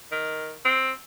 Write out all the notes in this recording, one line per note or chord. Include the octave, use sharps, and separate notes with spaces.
D#3
C4